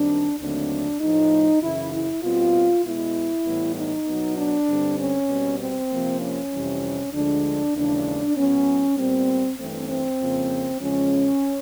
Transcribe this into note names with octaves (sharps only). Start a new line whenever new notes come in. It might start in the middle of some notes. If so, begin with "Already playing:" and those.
Already playing: F#2 D#3 G3 C4 D4
D#2 D3 F#3 A3 C4 D4
A2 F3 A3 D#4
F#2 C#3 E3 E4
E4
B2 G3 C4 F4
B2 G#3 B3 E4
A2 E3 G3 B3
D#4
B2 F#3 B3
D4
G2 D3 G3 C4
C#4
B2 G3 C4
C4
C3 F3 A#3
C#4
F2 C3 E3 G3
D2 D3 F3 G#3 D4
D#2 C#3 E3 G#3 D4
A2 F#3 B3 C#4
A#2 G3 B3 C4
G2 E3 A3 C4
C4
F2 C#3 F3 A#3
E2 C#3 F3 G#3 C#4